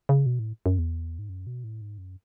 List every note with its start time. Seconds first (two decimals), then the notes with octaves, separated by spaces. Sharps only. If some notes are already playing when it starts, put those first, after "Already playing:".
0.09 C#3
0.26 B2
0.39 A2
0.66 F#2
0.78 E2
1.19 G#2
1.29 F#2
1.47 B2
1.64 A2
1.81 G#2
1.98 F#2